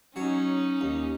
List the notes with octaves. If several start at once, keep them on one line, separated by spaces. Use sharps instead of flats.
F#3 C#4 D#4 C#5
D#2